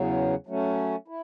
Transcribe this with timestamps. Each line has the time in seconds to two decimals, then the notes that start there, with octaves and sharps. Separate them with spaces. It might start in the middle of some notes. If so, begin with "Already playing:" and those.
Already playing: E2 C#3 F#3
0.47 F#3 A3 C#4
1.08 E4